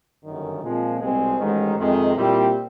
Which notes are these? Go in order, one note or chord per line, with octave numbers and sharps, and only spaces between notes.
G1 F#2 D#3
A#2 F3 G#3 C4
C2 B2 G#3 C4
A1 G#2 D#3 G#3
F2 C3 D#3 G#3
A#2 G3 C4 E4 G4